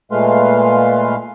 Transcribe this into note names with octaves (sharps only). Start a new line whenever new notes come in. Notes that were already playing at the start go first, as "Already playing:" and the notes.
A#2 G#3 A3 B4 F5 C6